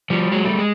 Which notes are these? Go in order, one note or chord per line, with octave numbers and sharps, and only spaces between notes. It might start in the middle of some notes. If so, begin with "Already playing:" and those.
F3 G3
F#3 G#3
G3 A3
G#3